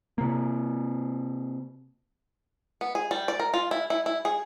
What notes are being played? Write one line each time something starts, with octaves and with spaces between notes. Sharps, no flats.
C3 A#3
B3
G#4
G3
D5
A#4
F4
E4
E4
E4
G#4